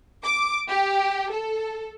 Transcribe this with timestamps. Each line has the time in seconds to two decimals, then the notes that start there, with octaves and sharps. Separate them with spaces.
0.24 D6
0.68 G4
1.32 A4